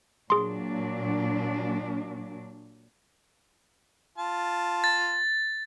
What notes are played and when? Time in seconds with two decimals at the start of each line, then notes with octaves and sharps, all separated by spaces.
0.30 A#2 F#3 D4 G#4 C6
4.18 F4 A5
4.84 A6